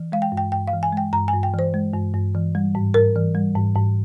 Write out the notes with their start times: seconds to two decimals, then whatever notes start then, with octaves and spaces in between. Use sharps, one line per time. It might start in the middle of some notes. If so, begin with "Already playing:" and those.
Already playing: E3
0.12 G#3 F5
0.22 G5
0.32 G2
0.37 G5
0.52 G2 G5
0.68 F5
0.73 E3
0.83 G#5
0.93 G#3 G5
1.13 G2 A#5
1.28 G#5
1.33 G2
1.43 G5
1.54 E3 C5
1.74 G#3
1.94 G2
2.14 G2
2.35 E3
2.55 G3
2.75 G#2
2.94 G#2 A#4
3.15 E3
3.35 G3
3.56 G#2
3.75 G#2